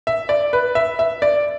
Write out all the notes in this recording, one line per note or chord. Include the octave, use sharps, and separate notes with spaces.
E5
D5
B4
E5
E5
D5